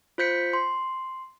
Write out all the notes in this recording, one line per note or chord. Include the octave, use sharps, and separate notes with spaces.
F4 C5 G6 B6 C#7
C6